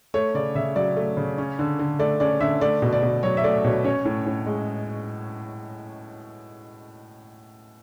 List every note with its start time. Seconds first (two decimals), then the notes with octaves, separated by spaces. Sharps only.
0.14 A3 C#5
0.34 C#3 D5
0.55 C#3 E5
0.76 F#3 D5
0.96 A3
1.17 C#3
1.38 C#4
1.59 D3
1.79 D3
1.99 A3 D5
2.20 C#4 D5
2.40 D3 E5
2.61 A3 D5
2.82 B2
2.93 D5
3.02 B2
3.23 F#3 C#5
3.37 E5
3.44 A3 D5
3.64 B2 C#5
3.84 C#4 C#5
4.05 A2
4.26 A2
4.46 G#3